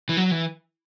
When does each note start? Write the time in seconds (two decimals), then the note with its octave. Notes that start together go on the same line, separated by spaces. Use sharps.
0.09 E3
0.17 F#3
0.31 E3